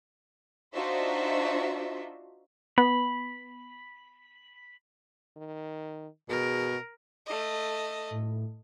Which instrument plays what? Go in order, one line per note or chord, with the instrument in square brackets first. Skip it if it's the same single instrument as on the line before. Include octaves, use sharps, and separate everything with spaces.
[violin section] D4 D#4 F4 F#4 C5 E5
[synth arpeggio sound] B3 [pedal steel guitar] B5
[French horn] D#3
[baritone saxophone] B2 [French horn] G#4 [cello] A#4
[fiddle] A3 D#5
[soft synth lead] A2